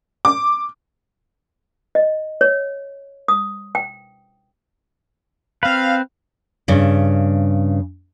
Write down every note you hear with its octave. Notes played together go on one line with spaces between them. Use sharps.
D6
D#5
C#5
D#6
G5
C4 B4 F5
G2 C#3